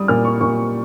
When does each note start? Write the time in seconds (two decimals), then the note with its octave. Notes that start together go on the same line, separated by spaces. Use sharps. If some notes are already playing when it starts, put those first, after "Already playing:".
Already playing: G3 D#6
0.08 A#2 F6
0.25 C#6
0.41 A#2 C#6